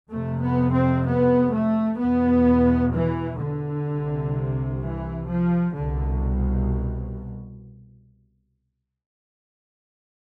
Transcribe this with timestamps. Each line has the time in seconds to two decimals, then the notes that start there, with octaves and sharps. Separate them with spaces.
0.10 F2 C3 A3
0.43 B3
0.73 C4
1.05 B3
1.52 A3
1.99 E2 B2 B3
2.93 E3
3.41 D3
3.87 C2 C3
4.82 E3
5.30 F3
5.77 C2 B2 D3